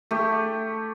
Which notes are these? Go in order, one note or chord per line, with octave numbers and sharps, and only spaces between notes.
A3 G4